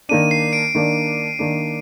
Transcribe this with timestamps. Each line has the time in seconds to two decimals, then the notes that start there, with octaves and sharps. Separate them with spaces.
0.09 D#3 A#3 D4 D#7
0.31 C7
0.53 D7
0.75 D#3 A#3 D4
1.39 D#3 A#3 D4